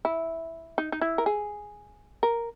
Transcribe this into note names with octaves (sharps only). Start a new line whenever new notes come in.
E4
D#4
D#4
E4
A#4
G#4
A#4